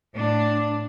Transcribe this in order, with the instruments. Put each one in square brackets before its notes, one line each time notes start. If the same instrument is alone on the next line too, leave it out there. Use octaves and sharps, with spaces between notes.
[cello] A2 D4